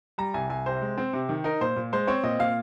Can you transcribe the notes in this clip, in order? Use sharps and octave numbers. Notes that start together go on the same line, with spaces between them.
G3 A#5
C2 G#5
C2 G#5
C3 C5
G#3
C4
C3
D#3
D#4 A#4
A#2 C5
A#2
G#3 C5
C4 C#5
A#2 D#5
A#2 F5